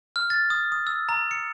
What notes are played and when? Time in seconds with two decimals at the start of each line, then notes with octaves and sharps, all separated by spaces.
0.16 F6
0.30 A6
0.50 D#6
0.72 D#6
0.87 E6
1.09 A#5
1.31 C#7